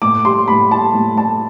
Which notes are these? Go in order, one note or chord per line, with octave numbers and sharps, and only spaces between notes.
A2 D6
G3 C6
A2 B5
G3 A5
A2
A2 A5